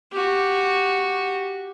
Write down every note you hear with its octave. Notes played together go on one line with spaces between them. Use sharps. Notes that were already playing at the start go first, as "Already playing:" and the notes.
F#4 G4